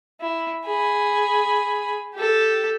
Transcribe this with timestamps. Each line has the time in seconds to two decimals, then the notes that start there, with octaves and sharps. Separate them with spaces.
0.21 E4
0.66 G#4 B5
2.14 G4 A4